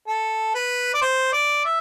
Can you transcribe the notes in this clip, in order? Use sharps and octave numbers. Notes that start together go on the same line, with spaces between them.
A4
B4
D5
C5
D5
E5